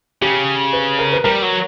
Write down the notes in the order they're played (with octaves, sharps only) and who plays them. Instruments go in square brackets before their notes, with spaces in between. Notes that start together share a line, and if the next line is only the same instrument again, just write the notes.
[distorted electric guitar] C#3 [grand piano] G4
[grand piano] B4
A#4
B4
[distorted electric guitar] G3 [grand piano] A#4
[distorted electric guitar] F#3